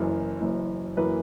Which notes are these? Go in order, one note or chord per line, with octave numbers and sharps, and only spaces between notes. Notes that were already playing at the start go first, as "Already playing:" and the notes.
Already playing: F#1 F#2 E3 A#4
F#1 F#2 E3
F#2 E3 A#3 B4